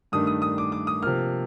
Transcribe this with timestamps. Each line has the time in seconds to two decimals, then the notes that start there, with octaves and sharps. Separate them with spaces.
0.12 G2 D#3 A3 D4 D#6
0.27 D#6
0.42 D#6
0.58 D6
0.72 D6
0.87 D#6
1.02 C3 F3 A#3 F6